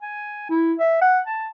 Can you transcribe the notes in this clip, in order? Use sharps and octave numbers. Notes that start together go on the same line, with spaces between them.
G#5
E4
E5
F#5
A5